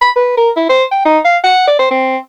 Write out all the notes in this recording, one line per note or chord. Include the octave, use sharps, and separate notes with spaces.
B5
B4
A#4
E4
C5
G5
D#4
F5
F#5
D5
C5
C4